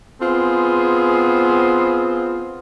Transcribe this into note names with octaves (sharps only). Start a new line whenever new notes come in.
B3 C4 F4 G#4